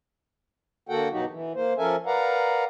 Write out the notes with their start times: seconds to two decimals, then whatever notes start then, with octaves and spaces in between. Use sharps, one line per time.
0.89 D3 A#3 F#4 A4 F#5 G5
1.11 G2 B2 F#3 D#4 F#4 G4
1.30 E3
1.55 A#3 C5
1.78 F3 C#4 A4 A#4 E5 G#5
2.06 A#4 B4 D5 F5 F#5 A#5